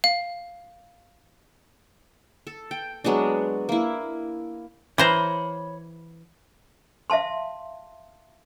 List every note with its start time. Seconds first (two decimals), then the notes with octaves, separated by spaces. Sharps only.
0.04 F5
2.47 A4
2.71 G5
3.04 F#3 G#3 B3 D4
3.69 A#3 E4
4.98 E3 C5 C#5 A#5 B5
7.10 E5 F5 A5 C6